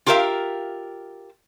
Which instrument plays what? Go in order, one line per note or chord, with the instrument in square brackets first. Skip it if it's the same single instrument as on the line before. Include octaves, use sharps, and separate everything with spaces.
[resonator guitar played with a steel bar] F4 G4 A#4 C#5 E5 F5